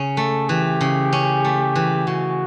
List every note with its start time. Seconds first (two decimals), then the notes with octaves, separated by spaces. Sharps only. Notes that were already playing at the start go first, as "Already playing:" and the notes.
Already playing: C#3 C#4
0.17 A3 A4
0.49 E3 G4
0.81 C#3
1.13 C#4
1.45 A3
1.76 E3
2.07 C#3 F#4